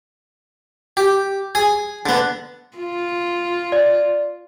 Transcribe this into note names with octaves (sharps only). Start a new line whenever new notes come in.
G4
G#4 D#6
D3 B3
F4
D5